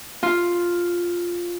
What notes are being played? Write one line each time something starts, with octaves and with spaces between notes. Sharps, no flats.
F4